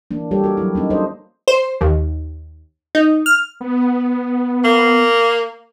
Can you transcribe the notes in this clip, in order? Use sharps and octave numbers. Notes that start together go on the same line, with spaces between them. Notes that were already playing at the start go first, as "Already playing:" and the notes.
E3 A#3 D4
G3 G4 A4 C#5
F#4 A#4
F#3 E4
A#3 C#4 D#4
D4 D#4 A4 C5 D#5
C5
D#2
D#4
F6
B3
A#3